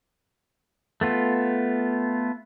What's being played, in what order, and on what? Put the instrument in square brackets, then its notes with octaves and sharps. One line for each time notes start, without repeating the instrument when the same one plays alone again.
[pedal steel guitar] A3 B3 F4